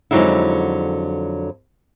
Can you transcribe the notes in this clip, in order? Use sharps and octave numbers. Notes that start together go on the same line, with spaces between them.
F2 D3 F#3 G#3 D#4 E4